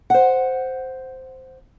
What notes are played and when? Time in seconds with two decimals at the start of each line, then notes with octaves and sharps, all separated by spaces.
0.10 C5 F#5